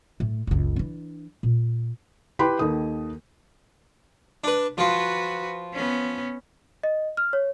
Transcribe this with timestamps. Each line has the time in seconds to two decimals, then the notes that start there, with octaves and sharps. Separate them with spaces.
0.20 A2 A3
0.47 F#1 C#2
0.76 E3 D4
1.43 A#2
2.39 E4 G4 B4 G5 B5 C6
2.59 D#2 D#3 A4 D#6
4.44 D4 B4
4.78 F3 F4 F#4 B4
5.73 B3 C#4
6.83 D#5
7.17 F6
7.33 C#5